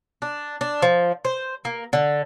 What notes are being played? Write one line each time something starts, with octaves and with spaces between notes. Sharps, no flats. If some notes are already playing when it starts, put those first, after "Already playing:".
D4
D4
F3
C5
A#3
D3